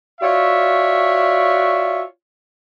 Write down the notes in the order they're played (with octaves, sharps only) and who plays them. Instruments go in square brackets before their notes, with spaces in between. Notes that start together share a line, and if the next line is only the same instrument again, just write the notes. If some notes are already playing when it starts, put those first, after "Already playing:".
[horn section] F4 F#4 C#5 D5 E5